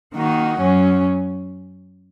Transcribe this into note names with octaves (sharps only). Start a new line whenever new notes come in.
D#3 A#3 D#4 F#4
F#2 F#3 C#4